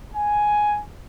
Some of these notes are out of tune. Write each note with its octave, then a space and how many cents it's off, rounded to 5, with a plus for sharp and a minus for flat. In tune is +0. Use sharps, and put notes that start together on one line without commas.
G#5 +5